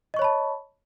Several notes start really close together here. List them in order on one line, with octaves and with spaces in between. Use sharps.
D#5 C#6 C#5 B5 A5